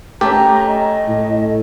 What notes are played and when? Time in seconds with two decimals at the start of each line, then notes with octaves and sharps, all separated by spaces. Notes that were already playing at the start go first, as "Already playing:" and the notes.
0.21 A3 C#4 G4 A#5
0.67 D#5
1.08 A2